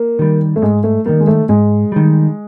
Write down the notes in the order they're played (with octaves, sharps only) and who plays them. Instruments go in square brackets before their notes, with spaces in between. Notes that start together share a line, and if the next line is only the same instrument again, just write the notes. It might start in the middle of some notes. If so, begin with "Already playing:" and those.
Already playing: [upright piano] A#3
[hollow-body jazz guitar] D#3 G3
[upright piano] A3
[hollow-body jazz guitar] G#2 [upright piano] G#3
[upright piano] A3
[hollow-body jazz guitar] D#3 G3 [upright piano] A#3
[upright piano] G#3
A3
[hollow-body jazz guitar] G#2 [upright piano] G#3
[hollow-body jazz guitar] D#3 G3